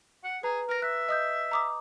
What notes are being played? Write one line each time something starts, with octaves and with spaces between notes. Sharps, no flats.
F#5
G#4 B4 A#5
A#4 B4 A#6
E5 F#6
D#5 D#6 G6
A#5 D6 D#6